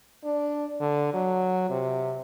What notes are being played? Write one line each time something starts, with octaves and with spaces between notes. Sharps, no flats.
D4
D3
F#3
C3